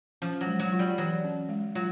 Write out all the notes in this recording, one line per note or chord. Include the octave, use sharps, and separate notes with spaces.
F3 C#4
F#3
G#3
F#3
F4
G3
E3 F#3
C#4
G#3
F#3 F4